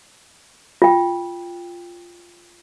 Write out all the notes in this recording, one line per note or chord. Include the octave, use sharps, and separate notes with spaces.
F4 G5